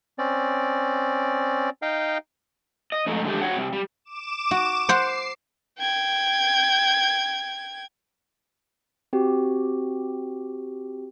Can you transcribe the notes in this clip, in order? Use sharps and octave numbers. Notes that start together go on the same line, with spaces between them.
C4 C#4 D5
D#4 D#5 F5 G5
D#5
F2 G#2 A3 D#4
D3 D#3 G#3 A3 G4
F#4 G#4 C#5 F#5 G5
C3 G3
G3
D6 E7
F#4
C5 F#5 C7
G5 G#6
C4 F#4 G4